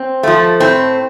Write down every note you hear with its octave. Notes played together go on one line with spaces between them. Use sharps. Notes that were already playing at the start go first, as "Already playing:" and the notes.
Already playing: C4
F3 A3
A2 C4